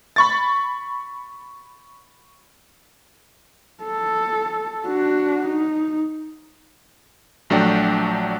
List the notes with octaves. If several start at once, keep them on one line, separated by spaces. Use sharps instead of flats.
B5 C#6 A6
A4
D4 F#4
D#4
A#1 F#3 A3 D4 F#4 G5